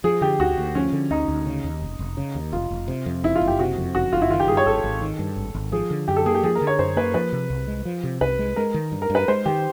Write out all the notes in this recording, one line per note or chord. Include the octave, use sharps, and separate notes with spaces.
F3 G#4
D3 G4
D2 F#4
D2
F3 C#4
D3
D2 D#4
D2
C#3
D#2
F1
F1
C#3
D#2
F1 F4
F1
C3
F2
F#1 E4
F4
F#1
G4
C3 F#4
F2
F#1 F#4
F#1 F4
E4
D#3 F4
G4
G2 G#4
C#5
G#1 A4
G#1
D#3
G2
G#1
G#1
F3 G#4
D3
F#2 G4
A4
A#3 G#4
G4
F3 G#4
A#4
D3
C#5
F#2 C5
A#3 B4
F3 B4
C3
C2
G#3
F3
C3
C2 B4
G#3
G#3 A#4
D#3
G2
A#4
G2
B4
G#3 C5
D#3 G4